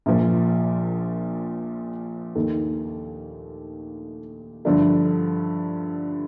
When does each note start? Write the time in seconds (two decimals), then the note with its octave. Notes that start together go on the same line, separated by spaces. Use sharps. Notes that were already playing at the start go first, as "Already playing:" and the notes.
0.06 A#1 A#2 F3
2.35 D#2 D#3 A3 D#4 A4
4.65 G2 D3 F3 A3 D4